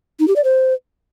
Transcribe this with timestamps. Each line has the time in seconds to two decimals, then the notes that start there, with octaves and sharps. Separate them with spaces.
0.20 D#4
0.28 G4
0.36 D5
0.44 C5